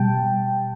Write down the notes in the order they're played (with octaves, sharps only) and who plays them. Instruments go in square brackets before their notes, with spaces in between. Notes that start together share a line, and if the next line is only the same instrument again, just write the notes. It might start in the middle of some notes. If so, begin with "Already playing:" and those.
Already playing: [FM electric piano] B2 G3 G5 A5